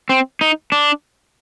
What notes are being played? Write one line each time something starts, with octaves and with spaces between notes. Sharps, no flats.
C4
D#4
D4